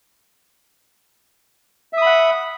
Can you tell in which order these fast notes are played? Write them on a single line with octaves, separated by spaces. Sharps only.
E5 D#6 B5 F#5